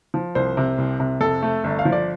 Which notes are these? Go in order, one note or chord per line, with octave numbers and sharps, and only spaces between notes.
F3
C2 C5
C3
C2
C3
F2 A4
A3
G1
F5
F3
D5